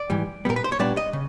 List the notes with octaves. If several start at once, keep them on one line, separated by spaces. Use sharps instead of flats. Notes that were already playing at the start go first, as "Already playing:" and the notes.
Already playing: D5
G#2 E3 G3
A#2 G3 B3 A#4
B4
C5
C#5
A#2 G3 B3 D4 D5
D#5
C#3